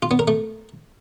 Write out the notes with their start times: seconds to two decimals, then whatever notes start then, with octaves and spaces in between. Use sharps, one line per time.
0.02 F4
0.11 B3
0.19 A#4
0.28 A3